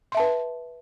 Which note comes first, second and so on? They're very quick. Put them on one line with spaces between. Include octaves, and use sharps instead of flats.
C6 E5 A5 B4